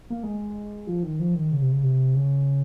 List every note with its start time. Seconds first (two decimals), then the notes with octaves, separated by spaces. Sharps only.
0.10 A#3
0.23 G#3
0.87 F3
1.03 D#3
1.19 F3
1.35 D#3
1.52 C#3
1.61 C3
1.72 C#3
1.83 C3
2.15 C#3